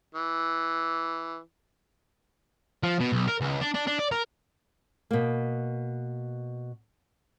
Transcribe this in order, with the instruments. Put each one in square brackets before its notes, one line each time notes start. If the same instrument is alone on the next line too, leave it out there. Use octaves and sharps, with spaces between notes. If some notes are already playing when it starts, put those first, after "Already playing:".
[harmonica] E3
[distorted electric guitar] F3
B2
B1
A#4
C#2
D4
D4
D4
D5
A#4
[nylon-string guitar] B2 A#3